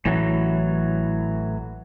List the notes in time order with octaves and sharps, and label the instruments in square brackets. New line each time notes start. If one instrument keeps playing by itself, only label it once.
[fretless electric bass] A1 [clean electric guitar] A2 E3 F#3